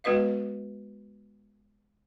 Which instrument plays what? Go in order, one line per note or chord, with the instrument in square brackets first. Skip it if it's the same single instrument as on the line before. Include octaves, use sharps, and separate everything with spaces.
[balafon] G#3 B3 F#4 B4 D#5 F5